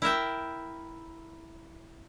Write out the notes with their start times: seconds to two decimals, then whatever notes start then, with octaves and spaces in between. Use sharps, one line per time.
0.02 E4 A#4 E5 G5